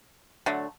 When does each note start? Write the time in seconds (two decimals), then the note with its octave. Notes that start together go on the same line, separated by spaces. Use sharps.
0.46 D3 F#3 A3